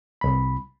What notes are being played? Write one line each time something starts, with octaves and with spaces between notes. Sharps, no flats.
C2 B5